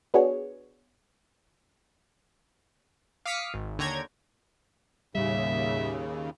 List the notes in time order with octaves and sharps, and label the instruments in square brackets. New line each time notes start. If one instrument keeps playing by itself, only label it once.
[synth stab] B3 D4 F#4 G#4 C#5
[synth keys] F5 D6 D#6 F6 B6 C#7
G#1
D#2 D3 C#5 G5 A#5 G#6
[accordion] D#2 C#3 [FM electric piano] A2 G3 [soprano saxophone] E5